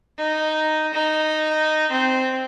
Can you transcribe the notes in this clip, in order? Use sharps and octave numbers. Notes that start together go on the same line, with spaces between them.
D#4
D#4
C4